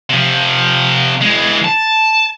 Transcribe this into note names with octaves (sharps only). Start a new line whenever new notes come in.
C3 F3
E3 G#3
A5